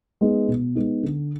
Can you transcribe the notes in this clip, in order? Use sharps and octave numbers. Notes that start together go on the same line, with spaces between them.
G#3 B3 D#4
B2
G#3 B3 D#4
D3